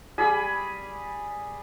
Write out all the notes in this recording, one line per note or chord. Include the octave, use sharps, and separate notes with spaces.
G3 G#4 B5